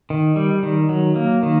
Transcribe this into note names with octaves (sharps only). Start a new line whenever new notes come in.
D#3
G3
D#3
F#3
A#3
D#3